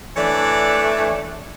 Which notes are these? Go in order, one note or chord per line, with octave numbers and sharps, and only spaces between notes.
E3 A3 D4 C#5 D5